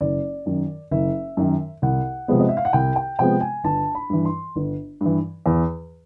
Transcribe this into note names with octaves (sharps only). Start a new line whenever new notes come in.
F#1 D5
F#2 D#3
F#1 E5
F#2 D#3
C2 F#5
C3 F3 G#3 B3
D#5
E5
F5
F#5
C2 G5
G5
C3 F3 G#3 B3 G5
G#5
G1 A5
B5
G2 E3
C6
G1
G2 E3
E2